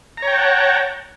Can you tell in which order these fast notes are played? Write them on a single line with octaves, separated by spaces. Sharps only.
A#5 C#5 G5 A5 F#5